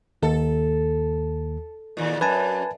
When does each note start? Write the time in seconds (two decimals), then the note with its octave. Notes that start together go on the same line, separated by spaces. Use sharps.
0.23 D#2 A4
1.97 D#2 A#2
2.21 F#2 B4 G#5 A5